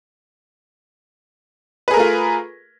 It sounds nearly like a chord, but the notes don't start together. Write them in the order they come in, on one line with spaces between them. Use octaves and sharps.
B4 G#4 A#4 A3 F4